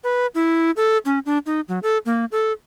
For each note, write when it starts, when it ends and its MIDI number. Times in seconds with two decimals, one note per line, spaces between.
0.04 0.26 71
0.35 0.71 64
0.77 0.98 69
1.05 1.19 61
1.26 1.38 62
1.46 1.61 63
1.68 1.79 54
1.83 1.98 69
2.06 2.25 58
2.32 2.52 69